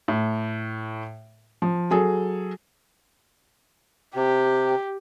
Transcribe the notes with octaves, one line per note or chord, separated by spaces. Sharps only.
A2
F3
F#3 G#4 A4
C3 G4